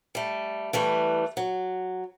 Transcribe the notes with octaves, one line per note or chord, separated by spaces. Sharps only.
G3 A3
E3 G3 A3 B4
F#3